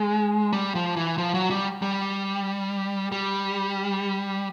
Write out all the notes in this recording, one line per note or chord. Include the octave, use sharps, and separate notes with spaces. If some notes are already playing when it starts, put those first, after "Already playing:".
Already playing: G#3
G3
F3
E3
F3
F#3
G3
G3
G3